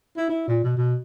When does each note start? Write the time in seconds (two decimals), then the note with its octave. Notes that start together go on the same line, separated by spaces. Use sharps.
0.17 E4
0.29 E4
0.48 A#2
0.64 B2
0.77 B2